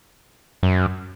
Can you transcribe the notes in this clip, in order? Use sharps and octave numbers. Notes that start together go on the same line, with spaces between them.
F#2